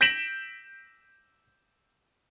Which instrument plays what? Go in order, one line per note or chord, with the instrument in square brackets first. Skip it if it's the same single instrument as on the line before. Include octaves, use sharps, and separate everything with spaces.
[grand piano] G6 A#6 B6 D7 E7 F#7